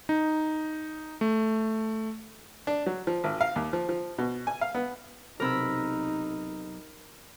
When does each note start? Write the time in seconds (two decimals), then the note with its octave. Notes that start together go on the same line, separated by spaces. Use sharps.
0.09 D#4
1.21 A3
2.67 D4
2.86 F#3
3.07 F3
3.24 G#1
3.41 F5
3.56 D#2
3.73 F3
3.89 F3
4.18 B2
4.47 G#5
4.61 F5
4.75 B3
5.40 B1 C3 D#4 A#4 B5 E6